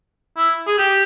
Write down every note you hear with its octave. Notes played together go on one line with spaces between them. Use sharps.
E4
G#4
G4